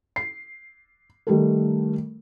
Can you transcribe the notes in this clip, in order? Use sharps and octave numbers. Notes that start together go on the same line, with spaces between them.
C7
D#3 G3 A3 A4 A#4